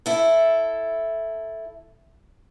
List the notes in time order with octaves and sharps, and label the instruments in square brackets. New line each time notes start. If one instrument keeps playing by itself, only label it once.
[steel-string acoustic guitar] E4 A4